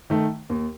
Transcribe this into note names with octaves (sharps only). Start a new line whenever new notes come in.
D#3 A3
D#2